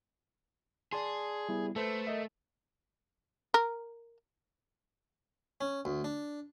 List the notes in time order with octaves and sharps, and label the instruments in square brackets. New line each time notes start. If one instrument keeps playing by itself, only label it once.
[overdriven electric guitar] G#4 [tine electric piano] D5 A5 C6
[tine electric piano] G3 B3 E4
[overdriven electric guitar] A3 [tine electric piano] A4 B4 C5
[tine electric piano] A#4 D#5 E5
[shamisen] A#4
[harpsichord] C#4
D2
D4